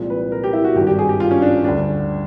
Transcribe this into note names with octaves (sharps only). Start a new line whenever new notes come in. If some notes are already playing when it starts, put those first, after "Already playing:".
Already playing: C2 A#2 F3 G#3
B4
A#4
G4
E4
F#4
G#1 G2 D#3 G3 G4
G4
G#4
G4
F4
C#4
D4
D2 D3 G3 D4